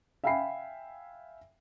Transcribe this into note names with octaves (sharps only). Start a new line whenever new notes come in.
E5 F5 G5 G#5 B5 C7